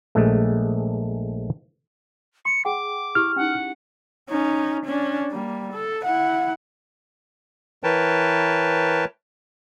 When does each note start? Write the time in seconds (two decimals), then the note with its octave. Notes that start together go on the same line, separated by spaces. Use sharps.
0.15 A#1 G#3 A3
2.45 C6 C#7
2.65 G#4 F#5 G5 D6
3.15 E4 G4 F6
3.36 C#4 D#4 F#5
4.30 C#4 D#4
4.85 C#4 D4
5.31 G3 A#3
5.73 A4
6.05 E4 F#5
7.84 E3 A#4 B4 C#5 G5 A5